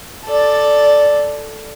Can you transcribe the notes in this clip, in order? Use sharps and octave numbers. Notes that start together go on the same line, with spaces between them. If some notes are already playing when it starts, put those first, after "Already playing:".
A4 D5